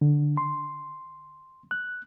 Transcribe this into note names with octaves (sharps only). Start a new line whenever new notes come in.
D3
C6
F#6